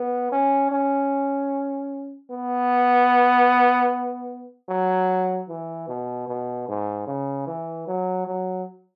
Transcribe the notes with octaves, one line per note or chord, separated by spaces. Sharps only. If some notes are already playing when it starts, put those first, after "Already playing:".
Already playing: B3
C#4
C#4
B3
F#3
E3
B2
B2
G#2
C#3
E3
F#3
F#3